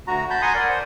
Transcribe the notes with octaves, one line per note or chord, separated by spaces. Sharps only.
D2 F#4 A#5
A5 B5 G6
F#5 G#5 A#5 C6 D#6
A#4 D5
C5